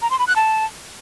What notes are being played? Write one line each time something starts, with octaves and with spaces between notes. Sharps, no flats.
A#5
C6
B5
F#6
A5